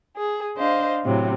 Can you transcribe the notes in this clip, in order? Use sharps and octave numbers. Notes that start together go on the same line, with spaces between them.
G#4
D4 C5 D#5 F5
A2 C3 F#3